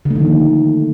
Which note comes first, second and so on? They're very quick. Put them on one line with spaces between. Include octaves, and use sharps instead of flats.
D3 A3 D#3 F3 A#3